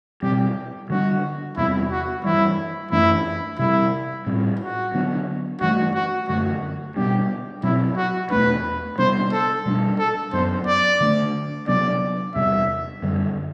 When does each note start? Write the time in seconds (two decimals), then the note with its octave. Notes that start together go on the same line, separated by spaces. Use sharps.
0.22 B2 G3 C4 G4
0.90 D3 G3 D4 F#4
1.57 E2 C3 G3 C4 E4
1.91 F#4
2.24 G2 E3 G3 E4
2.91 F#2 E3 A3 D4 E4
3.59 C3 G3 C4 E4
4.26 A2 G3 C4
4.60 F#4
4.94 D3 F#3 B3 D4
5.61 G2 E3 A3 F#4
5.95 F#4
6.29 F#2 D3 A3 F#4
6.96 B2 G3 B3 D4 G4
7.64 B2 F#3 C4 E4
7.97 F#4
8.31 E2 B2 A3 D4 B4
8.98 C3 G3 B3 D4 C5
9.32 A4
9.66 B2 G3 B3 D4
9.99 A4
10.33 F#2 F#3 B3 D4 C5
10.67 D5
11.00 D3 A3 D4
11.68 C3 F#3 B3 D4 D5
12.35 E2 C3 G3 E5
13.02 F#2 D3 G3